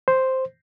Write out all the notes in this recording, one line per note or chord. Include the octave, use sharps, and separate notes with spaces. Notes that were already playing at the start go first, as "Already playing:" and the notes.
C5